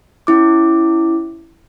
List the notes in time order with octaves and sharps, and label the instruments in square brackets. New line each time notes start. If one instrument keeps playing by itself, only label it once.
[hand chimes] C#4 E4 D6